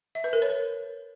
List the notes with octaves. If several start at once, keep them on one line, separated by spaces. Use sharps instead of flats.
E5
B4
A#4
C#5